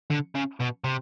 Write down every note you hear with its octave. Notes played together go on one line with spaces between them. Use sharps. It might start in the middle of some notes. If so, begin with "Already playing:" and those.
D3
C#3
B2
C3